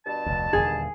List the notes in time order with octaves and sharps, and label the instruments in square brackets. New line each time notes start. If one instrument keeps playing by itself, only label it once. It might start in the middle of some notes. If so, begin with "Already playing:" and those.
[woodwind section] G2 B2 A5
[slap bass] F1 D2
[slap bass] D#1 B1 D3 [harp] G#4